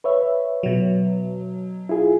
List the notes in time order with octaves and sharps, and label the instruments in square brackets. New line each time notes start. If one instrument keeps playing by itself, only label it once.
[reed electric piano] B4 C#5 E5
[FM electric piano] B2 F#3
[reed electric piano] E4 F4 G#4